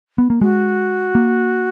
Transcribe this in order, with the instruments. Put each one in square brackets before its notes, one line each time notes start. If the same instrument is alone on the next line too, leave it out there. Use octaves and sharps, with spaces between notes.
[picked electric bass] B3
A#3
[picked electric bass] G#3 [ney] F#4
[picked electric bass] A#3